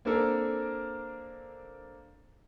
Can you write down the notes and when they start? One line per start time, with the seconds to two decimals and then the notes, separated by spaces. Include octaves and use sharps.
0.05 A#3 C4 D4 A4 A#4